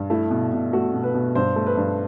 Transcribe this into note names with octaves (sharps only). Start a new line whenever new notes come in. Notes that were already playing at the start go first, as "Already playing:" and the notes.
Already playing: G2
A3 E4
B2
B2
A3 F#4
B2
B4
B2
G2 C5
A3
B4
G2